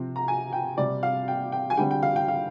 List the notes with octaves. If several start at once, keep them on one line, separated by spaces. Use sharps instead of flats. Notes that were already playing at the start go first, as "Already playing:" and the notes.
Already playing: C3 F3 C4
A#5
G#5
G5
C3 G3 C4 D5
F5
G5
G5
G#5
D3 G3 C4 G5
G5
F5
G5
F5